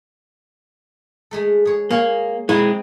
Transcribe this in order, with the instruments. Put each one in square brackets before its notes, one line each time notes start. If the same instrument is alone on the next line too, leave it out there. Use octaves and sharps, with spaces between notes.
[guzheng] G#3 A3 A4
G#4 C#5
[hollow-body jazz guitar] A#3 [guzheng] G#4 C#5 F5
[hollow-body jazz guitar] G#3 E4 [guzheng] C4 D#4